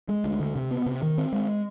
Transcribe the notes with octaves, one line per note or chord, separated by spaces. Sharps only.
G#3
D2
D3
C3
B3
C3
D#3
C4
G#3